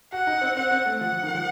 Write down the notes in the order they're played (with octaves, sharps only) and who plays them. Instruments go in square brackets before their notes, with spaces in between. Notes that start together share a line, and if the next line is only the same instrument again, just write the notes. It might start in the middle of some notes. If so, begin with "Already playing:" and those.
[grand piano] F#4 [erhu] F#5
[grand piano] D#4
C4
[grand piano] C4 [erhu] F#5
[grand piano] C4
A3
[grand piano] F3 [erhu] F#5
[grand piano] F3
D#3
F3